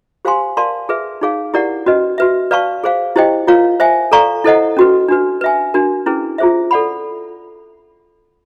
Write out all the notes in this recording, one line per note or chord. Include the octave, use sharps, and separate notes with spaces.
G4 C5 F5 G#5 C6
A#4 D5 F5 A5 C6
G#4 B4 E5
D#4 G#4 C#5 F5
E4 G4 A#4 D5 F#5
C#4 F#4 B4 D#5
F#4 B4 E5
B4 D5 F5 A5 C#6
G#4 C5 F5
E4 G4 C5 D#5 G5
F4 A#4 C#5 F5
C5 E5 G#5
A4 D5 F5 A#5 C#6
E4 A4 C5 D#5 F#5
C#4 F#4 B4
D4 F#4 B4
B4 E5 G#5
D4 F#4 A#4
C#4 E4 G#4 B4
F4 G#4 C5 E5
A4 D5 F#5 B5